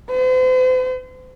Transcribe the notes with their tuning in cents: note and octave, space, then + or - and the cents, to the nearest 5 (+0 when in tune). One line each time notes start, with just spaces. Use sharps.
C5 -40